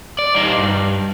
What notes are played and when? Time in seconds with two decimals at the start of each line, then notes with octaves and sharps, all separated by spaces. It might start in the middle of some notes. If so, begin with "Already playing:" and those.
0.19 D5
0.35 G3 D#4
0.58 G2